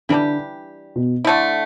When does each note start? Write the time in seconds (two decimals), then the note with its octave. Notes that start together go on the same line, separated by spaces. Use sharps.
0.09 D3 E3 G3 D4 G4
0.96 B2
1.25 D3 A3 E4